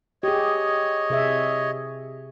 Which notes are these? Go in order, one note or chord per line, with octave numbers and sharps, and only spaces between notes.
G4 G#4 C#5 D#5
C3 G#4 E5